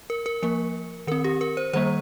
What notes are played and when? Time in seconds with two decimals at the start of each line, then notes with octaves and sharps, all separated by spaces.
0.10 A#4
0.26 A#4
0.43 F3 A#3 A#4
1.07 D#3 C4 A#4
1.24 G4
1.41 A#4
1.57 C5
1.73 D#3 G3 A#3 C5